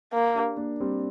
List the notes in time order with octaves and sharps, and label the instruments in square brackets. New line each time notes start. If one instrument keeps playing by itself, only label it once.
[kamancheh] A#3
[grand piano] D4 G4
A#3 D4
G3 C4